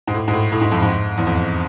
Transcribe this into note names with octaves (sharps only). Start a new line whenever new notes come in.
G#2
A2
G#2
A2
A2
G#2
F2
G#2
E2
F2